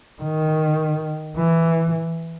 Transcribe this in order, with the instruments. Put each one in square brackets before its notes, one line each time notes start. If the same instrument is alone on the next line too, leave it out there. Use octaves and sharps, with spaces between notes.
[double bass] D#3
E3